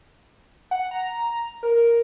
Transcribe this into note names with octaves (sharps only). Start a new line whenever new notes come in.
F#5
A#5
A#4